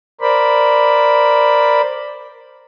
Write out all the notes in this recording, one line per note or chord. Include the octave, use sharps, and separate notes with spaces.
A#4 C5 D5 B5